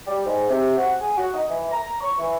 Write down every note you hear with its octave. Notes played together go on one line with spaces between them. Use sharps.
G3
G#2
C3
F#4
G#4
F#4
D#4
E3
A#5
C#6
E3